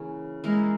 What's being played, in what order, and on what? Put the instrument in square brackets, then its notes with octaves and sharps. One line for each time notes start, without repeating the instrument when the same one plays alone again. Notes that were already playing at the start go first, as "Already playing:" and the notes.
Already playing: [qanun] C#3 E3 A#3 C#4
[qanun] E3 A#3 E4 A#4 [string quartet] G#3